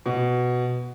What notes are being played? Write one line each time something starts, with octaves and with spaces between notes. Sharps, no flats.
B2